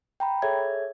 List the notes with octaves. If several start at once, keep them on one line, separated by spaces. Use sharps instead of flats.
G5 A#5 B5
G#4 A4 C#5 E5 G#6